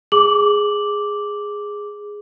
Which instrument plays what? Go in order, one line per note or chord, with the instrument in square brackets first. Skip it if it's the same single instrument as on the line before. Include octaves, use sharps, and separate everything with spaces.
[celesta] G#4 D6 F#7